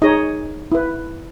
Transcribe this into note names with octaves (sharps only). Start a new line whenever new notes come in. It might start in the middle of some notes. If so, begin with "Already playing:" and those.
D#4 G#4 C#5 D#5
E4 B4